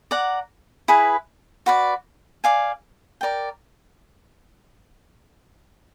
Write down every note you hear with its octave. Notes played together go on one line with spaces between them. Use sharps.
D5 F#5 A#5
E4 G#4 B4
F#4 B4 D5
D5 F5 G#5
A#4 D5 G5